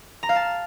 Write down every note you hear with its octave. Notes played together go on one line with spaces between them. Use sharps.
A#5
F5
A5